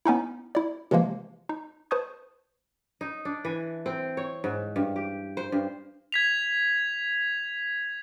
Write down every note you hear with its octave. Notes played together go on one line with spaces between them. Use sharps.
B3 C#4 D#4 E4
E4 D5
C3 E3 F3 G#3 A#3
D#4
B4 C5 A5 C#6 D#6 G#6
D#4
D4
E3
C4
C#5
G#2
G2
G4
C5
G2
G#6 B6 F7